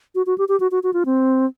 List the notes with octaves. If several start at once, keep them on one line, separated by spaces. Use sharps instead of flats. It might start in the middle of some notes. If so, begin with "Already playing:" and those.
F#4
F#4
G4
G4
F#4
F#4
F#4
F4
C4